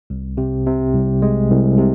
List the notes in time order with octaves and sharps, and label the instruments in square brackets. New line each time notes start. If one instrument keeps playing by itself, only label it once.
[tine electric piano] C2
C3
C3
C2
G#3
C2
C3